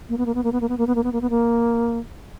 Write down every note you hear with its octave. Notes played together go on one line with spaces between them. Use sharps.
A#3
B3
A#3
B3
A#3
B3
A#3
B3
A#3
B3
A#3
B3
A#3
B3
A#3